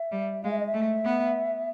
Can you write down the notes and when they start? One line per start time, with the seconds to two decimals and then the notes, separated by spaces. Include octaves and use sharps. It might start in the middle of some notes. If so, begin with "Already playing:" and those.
Already playing: E5
0.12 G3
0.44 G#3 F5
0.51 E5
0.60 D#5
0.67 E5
0.74 A3
1.05 B3